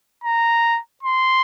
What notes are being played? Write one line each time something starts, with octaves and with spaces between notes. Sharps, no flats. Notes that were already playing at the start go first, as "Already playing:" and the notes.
A#5
C6